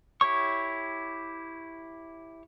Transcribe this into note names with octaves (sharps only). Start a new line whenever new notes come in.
E4 G4 C#5 C#6